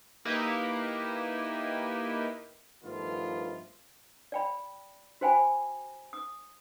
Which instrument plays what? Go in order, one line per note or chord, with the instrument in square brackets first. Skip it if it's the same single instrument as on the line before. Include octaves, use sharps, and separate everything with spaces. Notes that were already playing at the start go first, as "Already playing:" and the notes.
[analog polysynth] A#3 D#4 E4 G4 B4
[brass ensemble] G2 D#3 F3 A3 B3 F4
[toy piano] D5 G5 B5
F#4 C5 G5 G#5 B5
D#6